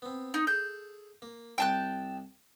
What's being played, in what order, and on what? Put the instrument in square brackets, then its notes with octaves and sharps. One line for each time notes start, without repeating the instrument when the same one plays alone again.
[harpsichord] B3 C4
[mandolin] D#4
[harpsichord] G#4 A4 [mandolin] G6
[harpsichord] A#3
[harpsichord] C2 [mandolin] G5 A5 F#6